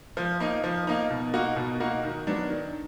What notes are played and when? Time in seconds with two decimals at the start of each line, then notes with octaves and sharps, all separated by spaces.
0.17 F3
0.40 A#3 D#4
0.64 F3
0.87 A#3 D#4
1.10 B2
1.34 A#3 D#4 F#4
1.56 B2
1.80 A#3 D#4 F#4
2.04 D#3
2.27 F#3 B3 D4
2.50 D#3